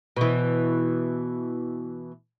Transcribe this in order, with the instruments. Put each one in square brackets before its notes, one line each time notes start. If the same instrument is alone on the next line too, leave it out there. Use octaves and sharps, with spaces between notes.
[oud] B2 E3